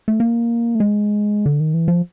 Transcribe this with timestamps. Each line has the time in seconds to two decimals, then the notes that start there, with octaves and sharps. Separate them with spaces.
0.08 A3
0.20 A#3
0.75 A3
0.80 G#3
1.46 D3
1.60 D#3
1.74 E3
1.88 F3